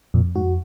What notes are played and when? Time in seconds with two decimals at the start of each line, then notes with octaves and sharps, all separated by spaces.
0.14 F2 A#2
0.35 G#2 F#4